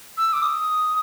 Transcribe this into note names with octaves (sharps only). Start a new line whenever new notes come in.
E6
D6
D#6